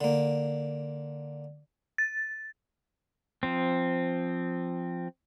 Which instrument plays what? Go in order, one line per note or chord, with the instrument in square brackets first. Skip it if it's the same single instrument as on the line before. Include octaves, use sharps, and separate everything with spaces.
[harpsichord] D3 A#3
[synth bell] A6
[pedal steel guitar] F3 C4